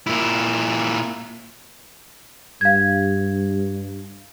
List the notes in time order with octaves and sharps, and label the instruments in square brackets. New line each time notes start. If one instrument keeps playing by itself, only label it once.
[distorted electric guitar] A#2 E4
[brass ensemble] G2 [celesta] F5 G#6